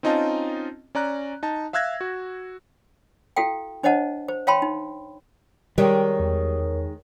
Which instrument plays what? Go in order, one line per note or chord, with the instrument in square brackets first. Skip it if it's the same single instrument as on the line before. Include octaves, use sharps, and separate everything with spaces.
[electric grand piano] C4 C#4 D#4 F4 D#5 A5
C#4 D5 A#5 F#6
D#4 A5
E5 F5 E6 F#6 G#6 A#6
F#4
[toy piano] E4 F#4 A4 F5 G5
D4 C5 C#5 D#5 F#5 A5
C5
C#5 F5 G5 A5 B5 C6
D#4
[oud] D#3 G#3 G4 [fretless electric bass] G3 [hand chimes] A#4 C#5
[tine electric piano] E2